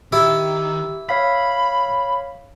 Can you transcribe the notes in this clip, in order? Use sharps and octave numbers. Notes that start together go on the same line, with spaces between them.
D#3 E4 G4
C#5 F5 B5 B6